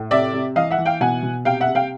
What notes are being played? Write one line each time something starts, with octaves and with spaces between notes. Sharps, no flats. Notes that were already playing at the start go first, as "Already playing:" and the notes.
Already playing: A2
C3 D5 E5
C3
E3 D#5 F5
E5 F#5
E3
F5 G5
B2 F#5 G#5
B2
C3 F5 G5
E5 F#5
C3
F5 G5